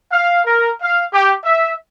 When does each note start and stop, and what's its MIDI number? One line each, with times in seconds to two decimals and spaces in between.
0.11 0.40 77
0.45 0.70 70
0.81 1.03 77
1.13 1.32 67
1.43 1.71 76